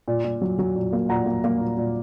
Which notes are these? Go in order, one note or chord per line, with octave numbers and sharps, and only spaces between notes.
A#2
A#2
F#3
F#3
A#2
A#3
A#2 F#5 A#5
A#3
A#3
A#2
A#2